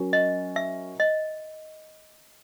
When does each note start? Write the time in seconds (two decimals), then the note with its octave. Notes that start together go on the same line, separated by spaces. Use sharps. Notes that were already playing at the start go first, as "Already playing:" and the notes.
Already playing: F#3 C#4 F#4 A#4
0.13 D#5
0.56 E5
1.00 D#5